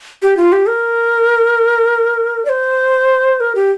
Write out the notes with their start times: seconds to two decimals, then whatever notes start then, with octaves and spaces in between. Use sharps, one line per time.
0.22 G4
0.37 F4
0.52 G4
0.68 A#4
2.45 D5
2.49 C5
3.40 A#4
3.55 G4